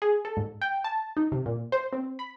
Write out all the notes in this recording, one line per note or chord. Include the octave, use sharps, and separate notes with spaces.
G#4
A4
G#2
G5
A5
D#4
C3
A#2
C5
C4
B5